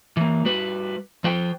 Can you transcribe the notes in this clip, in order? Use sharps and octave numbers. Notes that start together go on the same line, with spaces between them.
E3 A#3
G3 F#4 B4
F3 C5 G5